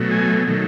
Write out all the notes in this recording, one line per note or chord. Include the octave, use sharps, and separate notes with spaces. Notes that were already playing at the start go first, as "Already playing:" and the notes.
Already playing: B2 F#3 A3
G#5
D#3 F#3 A3